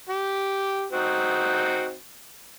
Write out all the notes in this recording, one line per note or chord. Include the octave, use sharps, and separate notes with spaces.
G4
C4 D#4 F#4